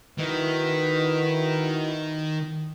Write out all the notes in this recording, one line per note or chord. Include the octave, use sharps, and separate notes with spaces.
D#3 D#4 E4 F#4 B4